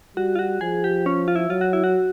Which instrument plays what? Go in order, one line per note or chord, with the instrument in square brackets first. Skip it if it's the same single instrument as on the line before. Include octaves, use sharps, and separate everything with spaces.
[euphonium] G3 [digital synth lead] F#4
[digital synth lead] F4
F#4
[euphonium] F3 [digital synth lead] G#4
[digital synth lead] G4
C#4
F4
E4
[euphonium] F#3 [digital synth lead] F4
[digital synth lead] F#4
E4
F#4